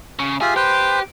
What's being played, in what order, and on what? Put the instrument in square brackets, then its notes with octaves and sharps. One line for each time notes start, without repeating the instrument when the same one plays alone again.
[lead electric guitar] C#3
[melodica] F4 G4 E5 [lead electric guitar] G#4
[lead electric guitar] G4 [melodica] B4 C5